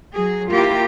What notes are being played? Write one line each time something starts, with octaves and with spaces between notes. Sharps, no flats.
F#3 G#4
A#3 E4 F4 G4 A#4